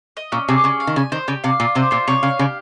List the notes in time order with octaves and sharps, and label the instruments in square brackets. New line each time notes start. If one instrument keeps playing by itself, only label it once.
[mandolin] D#5
[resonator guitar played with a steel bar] A#2 [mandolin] C#4
[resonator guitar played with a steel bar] C3 [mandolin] G#4
[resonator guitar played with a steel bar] C#3 [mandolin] C#4
[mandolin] F5
[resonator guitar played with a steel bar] D#3
[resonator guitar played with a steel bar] C#3 [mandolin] G#5
[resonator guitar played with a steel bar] D#3 [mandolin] C5
[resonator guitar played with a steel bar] C#3 [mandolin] G4
[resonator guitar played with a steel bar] C3 [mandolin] F5
[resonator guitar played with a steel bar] A#2 [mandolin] F4
[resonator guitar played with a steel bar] C3 [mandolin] C5
[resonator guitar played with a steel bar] A#2 [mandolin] F4
[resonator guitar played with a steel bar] C3 [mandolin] C#5
[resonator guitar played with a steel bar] C#3 [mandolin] F5
[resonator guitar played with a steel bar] C#3 [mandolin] G4